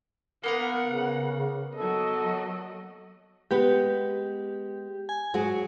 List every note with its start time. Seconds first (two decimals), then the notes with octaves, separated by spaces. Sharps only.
0.44 A#3 B3 A#4 F#5
0.86 C#3
1.75 F#3 A4 D#5
3.51 G#3 B3 G4 B4
5.09 G#5
5.34 G#2 F#3 F#4 G#4